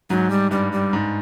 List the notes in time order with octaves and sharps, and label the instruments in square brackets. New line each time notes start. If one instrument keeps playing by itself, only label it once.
[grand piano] G#2 [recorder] F#3
[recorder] G3
[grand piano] G2 [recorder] G3
[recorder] G3
[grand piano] G#2